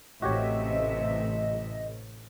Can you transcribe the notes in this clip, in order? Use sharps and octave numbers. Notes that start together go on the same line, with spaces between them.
A1 C3 A3 F#4 G4 C#5 D#5 E5